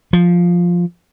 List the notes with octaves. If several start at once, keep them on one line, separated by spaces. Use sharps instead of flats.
F3